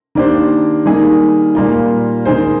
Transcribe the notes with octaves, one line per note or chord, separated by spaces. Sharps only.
D#3 A#3 D4 G4 C5
D#3 G3 A#3 D#4 G#4
A#2 G3 A#3 F4
D#3 G#3 D#4 G#4 C5